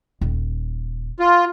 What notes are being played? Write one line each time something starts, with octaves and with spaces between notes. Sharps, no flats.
D#1
F4